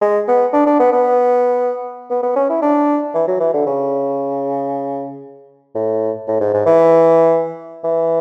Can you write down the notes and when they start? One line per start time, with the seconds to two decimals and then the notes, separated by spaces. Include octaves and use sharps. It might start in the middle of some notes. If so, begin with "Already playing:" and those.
0.01 G#3
0.28 B3
0.53 D4
0.67 D4
0.80 B3
0.92 B3
2.10 B3
2.23 B3
2.36 C#4
2.49 E4
2.62 D4
3.14 E3
3.28 F#3
3.40 E3
3.54 D3
3.67 C#3
5.75 A2
6.28 A2
6.40 G#2
6.54 G#2
6.66 E3
7.84 E3